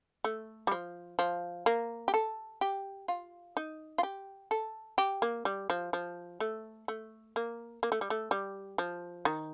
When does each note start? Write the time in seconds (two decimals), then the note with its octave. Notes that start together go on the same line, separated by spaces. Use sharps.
0.24 A3
0.67 G3
0.72 F3
1.19 F3
1.66 A#3
2.08 G4
2.14 A4
2.61 G4
3.08 F4
3.57 D#4
3.98 F4
4.03 G4
4.51 A4
4.98 G4
5.22 A#3
5.45 G3
5.70 F3
5.93 F3
6.40 A3
6.88 A3
7.36 A#3
7.83 A#3
7.92 A3
8.01 G3
8.10 A3
8.31 G3
8.78 F3
9.25 D#3